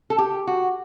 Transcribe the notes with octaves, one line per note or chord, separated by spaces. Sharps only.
A4
G4
F#4